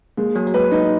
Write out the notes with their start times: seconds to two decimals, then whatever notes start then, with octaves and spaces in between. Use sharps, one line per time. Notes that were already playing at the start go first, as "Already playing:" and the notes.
0.17 G#3 A#3
0.36 F#3 G#4
0.47 F#3
0.54 G#3 B4
0.71 G#3 D#4